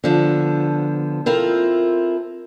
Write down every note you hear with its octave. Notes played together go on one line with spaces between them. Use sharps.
D3 F3 B3
C4 E4 F4 A4 A#4